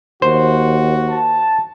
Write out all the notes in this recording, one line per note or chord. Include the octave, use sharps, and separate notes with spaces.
D#2 F#4 C5
A5